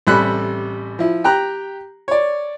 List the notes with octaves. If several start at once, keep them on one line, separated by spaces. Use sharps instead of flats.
A1 C3 G3 A4 B5 F#6
F3 E4
G4 G5 A#5 F#6
C#5 D5